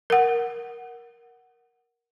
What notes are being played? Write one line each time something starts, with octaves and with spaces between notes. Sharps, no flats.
A#4 F#5